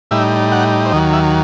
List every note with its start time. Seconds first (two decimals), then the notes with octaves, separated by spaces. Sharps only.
0.11 A2 G3 D#4 E5
0.52 F#5
0.86 C5
0.92 D#2 D#3 F#3 D#5
1.13 E5